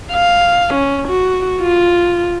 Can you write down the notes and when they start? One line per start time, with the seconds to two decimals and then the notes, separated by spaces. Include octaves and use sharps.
0.12 F5
0.74 C#4
1.08 F#4
1.61 F4